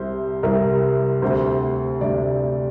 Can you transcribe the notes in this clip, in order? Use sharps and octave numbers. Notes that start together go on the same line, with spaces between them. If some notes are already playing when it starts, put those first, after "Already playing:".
Already playing: C2 C3 C5
C2 C3 A#4
D2 C3 C5
D2 C3 D5